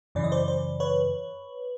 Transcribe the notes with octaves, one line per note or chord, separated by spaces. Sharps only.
F#2 C#3 E3 D5
D#5
C5 D5
C5 D5
B4 C#5